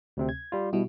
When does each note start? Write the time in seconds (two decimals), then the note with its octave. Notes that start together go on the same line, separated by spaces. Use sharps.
0.17 D2 C3 C4
0.29 G#6
0.52 G3 F4
0.73 B2 G3 E4 F#4